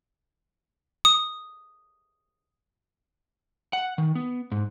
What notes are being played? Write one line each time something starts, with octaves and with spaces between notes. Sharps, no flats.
D#6
F#5
D#3
B3
G#2